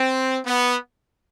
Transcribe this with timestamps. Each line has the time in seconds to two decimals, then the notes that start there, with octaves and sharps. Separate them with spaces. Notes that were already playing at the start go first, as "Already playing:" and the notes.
Already playing: C4
0.45 B3